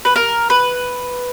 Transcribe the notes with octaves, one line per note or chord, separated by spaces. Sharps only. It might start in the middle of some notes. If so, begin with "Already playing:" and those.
B4
A#4
B4